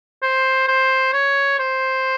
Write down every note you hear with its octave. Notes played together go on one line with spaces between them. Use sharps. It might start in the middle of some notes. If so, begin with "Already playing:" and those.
C5
C5
C#5
C5